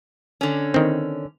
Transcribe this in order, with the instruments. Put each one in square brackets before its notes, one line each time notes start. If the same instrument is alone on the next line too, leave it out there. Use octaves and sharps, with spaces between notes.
[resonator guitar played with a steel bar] D3 C#4
[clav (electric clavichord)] D#3 C4